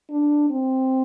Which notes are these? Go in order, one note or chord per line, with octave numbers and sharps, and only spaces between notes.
D4
C4